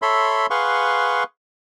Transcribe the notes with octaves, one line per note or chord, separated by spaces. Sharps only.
A4 C#5 E5 B5 C6
G#4 B4 F5 F#5 C6 C#6